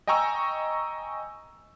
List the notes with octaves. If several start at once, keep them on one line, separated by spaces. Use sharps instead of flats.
D#5 G5 G#5 A#5 C#6 E6